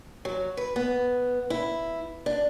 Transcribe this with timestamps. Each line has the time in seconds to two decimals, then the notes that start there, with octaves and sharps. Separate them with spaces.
0.25 F#3
0.57 B4
0.76 B3
1.50 E4
2.26 D4